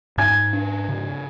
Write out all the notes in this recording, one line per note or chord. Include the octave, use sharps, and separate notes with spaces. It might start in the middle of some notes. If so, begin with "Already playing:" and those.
G#2 G#5 G#6
D4
C#3